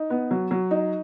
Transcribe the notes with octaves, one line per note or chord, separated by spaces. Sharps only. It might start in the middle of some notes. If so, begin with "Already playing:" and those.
Already playing: D#4
B3
F#3
F#3
D#4